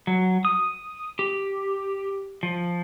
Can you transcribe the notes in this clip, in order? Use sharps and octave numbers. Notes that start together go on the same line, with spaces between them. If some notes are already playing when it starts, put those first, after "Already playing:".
F#3
D#6
G4
F3